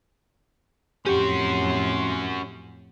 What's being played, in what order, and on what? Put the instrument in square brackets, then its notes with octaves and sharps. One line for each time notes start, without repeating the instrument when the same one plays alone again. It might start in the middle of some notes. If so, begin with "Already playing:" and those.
[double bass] F2 A2 [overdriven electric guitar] C#4 F#4 [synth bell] G4 [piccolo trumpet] C6